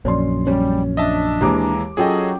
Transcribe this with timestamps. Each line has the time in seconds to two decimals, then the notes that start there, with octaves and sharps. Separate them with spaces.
0.05 A#1 F#2 C#4 D5 C6
0.47 G3 C#4
0.97 D4 D#5 E5 A5
1.41 D#2 E3 G#3 A#5 D6
1.97 F#3 C#4 F4 G#4 A4 D#5 G5